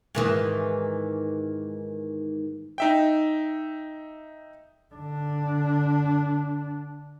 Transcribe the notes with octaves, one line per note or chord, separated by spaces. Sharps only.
G#2 D#3 E3
D#4 E5 G5
D3 D4